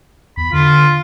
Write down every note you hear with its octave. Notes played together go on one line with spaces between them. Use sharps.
E2 B5
D3 F4